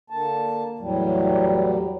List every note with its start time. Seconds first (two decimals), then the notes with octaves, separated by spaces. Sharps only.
0.10 D3 A#3 A5
0.79 E2 A2 F#3 G3